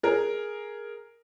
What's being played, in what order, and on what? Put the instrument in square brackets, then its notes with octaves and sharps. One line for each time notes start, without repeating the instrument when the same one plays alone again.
[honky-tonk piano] G#4 A#4